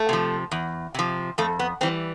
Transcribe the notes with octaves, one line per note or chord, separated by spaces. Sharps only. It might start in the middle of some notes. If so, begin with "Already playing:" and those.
Already playing: A3
C3 F3
E2
C3 F3
F2 A3
B3
E3 G3 C4